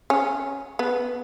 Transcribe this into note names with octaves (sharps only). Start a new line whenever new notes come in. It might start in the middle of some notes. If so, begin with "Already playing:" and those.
C#4
B3